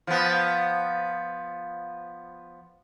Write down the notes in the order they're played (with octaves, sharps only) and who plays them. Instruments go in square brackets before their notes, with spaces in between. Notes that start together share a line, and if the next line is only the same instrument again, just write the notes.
[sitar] F3 B3